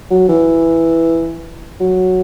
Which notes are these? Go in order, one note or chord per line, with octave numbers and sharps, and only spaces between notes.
F#3
E3
F#3